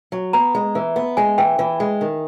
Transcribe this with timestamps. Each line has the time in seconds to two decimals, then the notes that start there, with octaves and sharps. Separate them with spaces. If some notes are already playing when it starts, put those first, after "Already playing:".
0.12 F#3
0.33 B3 A#5
0.55 G#3
0.75 E3
0.96 B3
1.17 G#3 G#5
1.38 E3 G5
1.59 E3
1.80 G#3
2.01 D#3